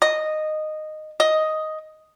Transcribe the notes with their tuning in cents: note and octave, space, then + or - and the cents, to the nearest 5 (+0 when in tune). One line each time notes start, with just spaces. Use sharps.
D#5 -10
D#5 +5